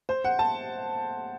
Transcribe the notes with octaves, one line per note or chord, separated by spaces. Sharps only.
C5
F#5
A5